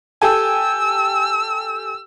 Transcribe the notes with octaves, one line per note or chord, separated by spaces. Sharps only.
G4 A4 G#5 E6